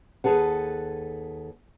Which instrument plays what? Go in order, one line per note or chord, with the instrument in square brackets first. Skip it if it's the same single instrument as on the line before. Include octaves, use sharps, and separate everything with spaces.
[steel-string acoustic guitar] D#2 C3 G#4 A4 B4 F#5